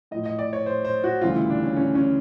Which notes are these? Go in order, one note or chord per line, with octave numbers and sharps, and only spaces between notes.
A2 F3 D#5
D#5
D5
C#5
C5
C5
F#4
D2 C#3 E3 G3 F4
E4
D4
C#4
C#4
C#4